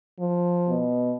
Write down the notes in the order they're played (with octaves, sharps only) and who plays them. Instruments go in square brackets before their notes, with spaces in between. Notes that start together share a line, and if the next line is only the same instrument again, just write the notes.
[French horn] F3
[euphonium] B2